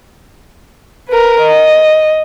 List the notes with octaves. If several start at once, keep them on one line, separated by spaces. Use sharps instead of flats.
A#4 B4
D#5